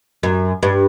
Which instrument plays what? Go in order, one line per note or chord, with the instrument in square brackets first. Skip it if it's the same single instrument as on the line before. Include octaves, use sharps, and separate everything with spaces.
[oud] F#2
G2